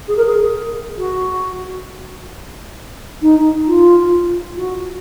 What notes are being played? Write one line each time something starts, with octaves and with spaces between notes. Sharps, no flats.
G#4
A#4
G#4
F#4
D#4
F4
F#4